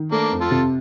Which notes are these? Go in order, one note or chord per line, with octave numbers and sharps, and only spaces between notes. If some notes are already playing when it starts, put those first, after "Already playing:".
Already playing: D#3
A3 A#3 D4
F2
F4 A4
C3